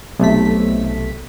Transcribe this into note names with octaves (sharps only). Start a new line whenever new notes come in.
B1 C3 A3 B6